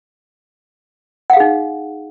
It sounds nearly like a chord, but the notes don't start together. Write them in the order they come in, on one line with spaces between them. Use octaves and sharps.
F#5 F5 G#4 D#4